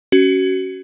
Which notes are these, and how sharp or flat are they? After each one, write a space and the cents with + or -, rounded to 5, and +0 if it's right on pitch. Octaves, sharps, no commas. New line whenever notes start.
C#4 +5 F#4 +25